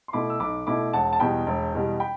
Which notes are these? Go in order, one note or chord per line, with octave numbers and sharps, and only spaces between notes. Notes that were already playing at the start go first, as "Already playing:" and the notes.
C6
B2 A3 E4 B5 D6
E6
B1 B5 D6
B2 A3 E4 B5 D6
E1 F#5 A5
A5
E2 B2 G3 G5 B5
E1
E2 B2 G3
G5 B5